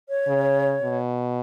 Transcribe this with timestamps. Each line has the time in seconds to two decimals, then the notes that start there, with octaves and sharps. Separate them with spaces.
0.09 C#5
0.28 C#3
0.82 B2